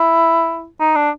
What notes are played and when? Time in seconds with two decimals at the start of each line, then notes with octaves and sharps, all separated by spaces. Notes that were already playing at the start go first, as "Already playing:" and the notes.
Already playing: E4
0.80 D#4
0.96 D4